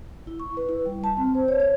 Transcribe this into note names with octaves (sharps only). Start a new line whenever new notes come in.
E4
C#6
B4
E4
G3
A5
C4
C5
C#5
C#5